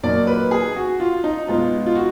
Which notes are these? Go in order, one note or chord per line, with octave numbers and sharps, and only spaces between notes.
A#2 F#3 A#3 D#4 D5
B4
G#4
F#4
F4
D#4
B2 G#3 B3 D#4 F4
F4
F#4